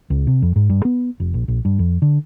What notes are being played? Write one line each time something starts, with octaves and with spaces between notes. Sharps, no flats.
C#2
C3
F2
G#2
G2
B3
F1
A#1
A#1
G2
F2
D3